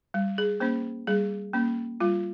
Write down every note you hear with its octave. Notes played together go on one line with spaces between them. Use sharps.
G3
G#4
A#3 C#4 C5
G3 G#4
A#3 C#4
G3 F4